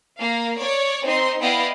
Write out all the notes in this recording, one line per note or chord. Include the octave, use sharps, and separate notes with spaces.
A#3 F5
C#5 D5
C4 D#4 C6
B3 E4 D5 D#5 F5 G5